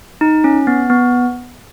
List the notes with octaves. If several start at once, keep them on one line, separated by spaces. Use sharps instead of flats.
D#4
C#4
B3
B3